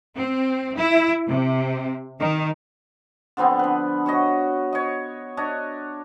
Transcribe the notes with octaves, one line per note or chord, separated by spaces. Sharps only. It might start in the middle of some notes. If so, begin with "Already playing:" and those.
C4
E4
C3
D#3
D3 F3 B3 C4
D3 B4
F#4 C#5 D#5 C#6
C#5 D#5
D4 C#5 D#5